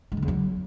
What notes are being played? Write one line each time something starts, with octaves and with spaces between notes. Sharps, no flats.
G#3
D3
E2
F#3